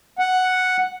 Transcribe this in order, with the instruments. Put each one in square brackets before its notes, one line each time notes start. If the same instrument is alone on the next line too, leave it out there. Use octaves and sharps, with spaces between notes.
[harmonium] F#5